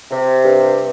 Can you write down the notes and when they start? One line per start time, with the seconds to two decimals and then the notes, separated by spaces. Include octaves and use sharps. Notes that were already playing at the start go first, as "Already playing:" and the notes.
0.11 C3
0.44 G2